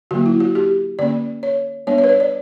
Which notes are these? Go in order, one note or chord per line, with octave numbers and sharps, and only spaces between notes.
D3 F#3 A#3 F#4
E4
F#4
G4
D3 A#3 C#4 D5
C#5
G3 B3 D4 C#5
C#5
B4
C#5
D5